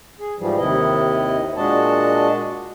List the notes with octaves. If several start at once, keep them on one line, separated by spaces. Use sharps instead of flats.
G#4
G#2 E3 F3 G3
D#2 C3 D#3 E4 D#5
A#2 G#3 D4 F#4 D#5 A5